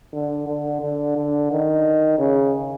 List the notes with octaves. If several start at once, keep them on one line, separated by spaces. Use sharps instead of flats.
D3
D3
D3
D3
D#3
C#3